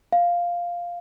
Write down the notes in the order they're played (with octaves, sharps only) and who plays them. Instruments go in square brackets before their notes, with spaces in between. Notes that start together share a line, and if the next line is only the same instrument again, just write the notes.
[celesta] F5